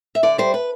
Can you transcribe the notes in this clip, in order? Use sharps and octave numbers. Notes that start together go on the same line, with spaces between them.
E5
D3 D5
G3 C5
B4